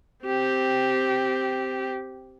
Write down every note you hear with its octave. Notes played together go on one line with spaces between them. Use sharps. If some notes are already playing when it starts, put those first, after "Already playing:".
C4 G4